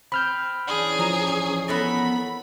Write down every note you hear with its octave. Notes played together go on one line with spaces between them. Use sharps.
C4 B5 F6 G6
E3 C#4 D4 G#4
F3 A#5
B3 A4 A#4 B5